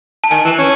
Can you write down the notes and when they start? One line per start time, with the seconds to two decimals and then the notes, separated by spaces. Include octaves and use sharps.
0.24 A5
0.31 D#3 G#5
0.45 E3
0.59 C#4